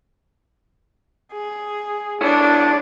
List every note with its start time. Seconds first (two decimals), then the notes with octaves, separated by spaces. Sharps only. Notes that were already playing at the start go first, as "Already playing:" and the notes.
1.32 G#4
2.21 D4 E4 G#4 C#5